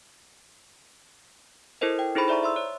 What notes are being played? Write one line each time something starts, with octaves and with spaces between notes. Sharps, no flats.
E4 A4 A#4 C5 D#5
G5
D#4 E4 G#4 A4 C5 B5
C5 D5 E5 A#5 C#6
E5 C6 E6
C#5